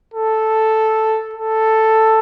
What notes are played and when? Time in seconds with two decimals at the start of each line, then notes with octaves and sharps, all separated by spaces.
0.14 A4
1.33 A4